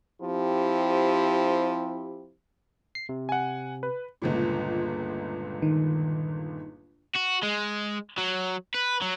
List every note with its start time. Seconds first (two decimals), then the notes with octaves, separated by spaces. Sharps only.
0.22 F3 C4 E4 G4
2.95 C7
3.09 C3
3.29 F#5 G#5
3.83 B4
4.22 G1 C#2 A#2
5.62 D#3
7.16 F#4
7.43 G#3
8.18 F#3
8.74 B4
9.01 F#3